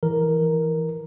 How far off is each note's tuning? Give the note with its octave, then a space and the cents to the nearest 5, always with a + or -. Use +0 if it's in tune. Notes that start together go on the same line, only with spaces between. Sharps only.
E3 +0 A#4 +0